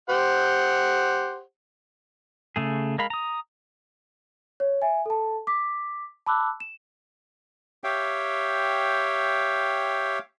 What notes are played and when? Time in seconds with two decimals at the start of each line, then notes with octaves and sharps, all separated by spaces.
0.10 G4 C5 F#5
2.56 C#3 A3 G#4
2.98 G#3 A#4 F5 B5
3.10 A#5 D#6
4.60 C#5
4.82 E5 G#5
5.06 A4 A5
5.47 D6 B6
6.26 A5 B5 D6 E6 F#6
6.60 E7
7.84 G4 C#5 E5 F5 G5